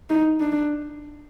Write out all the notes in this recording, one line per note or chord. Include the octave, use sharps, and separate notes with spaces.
D#4
D4